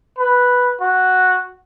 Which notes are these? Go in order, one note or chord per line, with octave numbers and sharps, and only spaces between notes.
B4
F#4